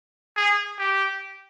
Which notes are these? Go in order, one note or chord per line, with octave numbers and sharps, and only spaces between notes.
G#4
G4